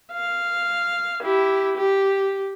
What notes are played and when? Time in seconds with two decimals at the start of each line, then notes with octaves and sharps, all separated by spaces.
0.13 F5
1.23 E4 G4
1.77 G4